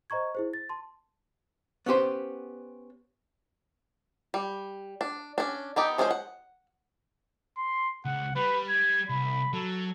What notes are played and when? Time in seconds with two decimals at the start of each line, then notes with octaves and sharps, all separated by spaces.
0.10 C5 D#5 A#5 C#6 G#6
0.35 E4 G#4 C5
0.53 A6
0.69 A5 C6
1.86 B3 C#4 G4 C5
4.34 G3
5.01 D4
5.38 C#4 D4
5.76 B3 D#4 G4 A4
5.98 F3 G#3 C#4 D4 C5
6.10 F#5
7.57 C6
8.05 C#2 F#5
8.35 G3 B4
8.69 G#6
9.09 C2 B5
9.53 F#3 A4